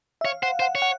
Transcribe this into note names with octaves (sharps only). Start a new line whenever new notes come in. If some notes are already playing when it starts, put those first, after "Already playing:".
E5
C#5 F5
C5 F#5
C5 F#5
C#5
F#5